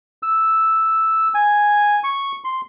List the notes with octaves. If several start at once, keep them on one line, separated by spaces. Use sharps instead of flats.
E6
G#5
C#6
C6